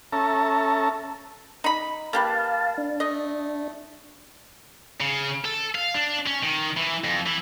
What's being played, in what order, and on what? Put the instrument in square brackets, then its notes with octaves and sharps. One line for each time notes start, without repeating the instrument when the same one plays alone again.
[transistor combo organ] C#4 A4 E5 A5 A#5
[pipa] D#4 B5
[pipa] A#3 G4 B4 [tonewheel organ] F5 A5
[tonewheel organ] D4
[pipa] A3 D#5
[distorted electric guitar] C#3
A4
F5
D4
C#4
D#3
E3
F2
E3